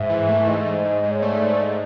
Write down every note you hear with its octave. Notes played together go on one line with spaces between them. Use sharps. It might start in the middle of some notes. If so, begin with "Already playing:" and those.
Already playing: G#2 E5
E3
A3
G#2 D#5
G#2
G#2
G#2
C#5
A3 D5
G#2
G#2 D#5